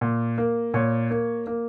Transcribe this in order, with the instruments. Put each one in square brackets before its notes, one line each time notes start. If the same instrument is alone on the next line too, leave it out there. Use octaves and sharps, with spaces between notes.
[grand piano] A#2
A#3
A#2 C#5
A#3
A#3